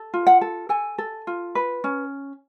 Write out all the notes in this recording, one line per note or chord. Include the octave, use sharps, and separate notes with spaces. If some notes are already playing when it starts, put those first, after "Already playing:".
Already playing: A4
F4
F#5
A4
A4 G#5
A4
F4
B4
C#4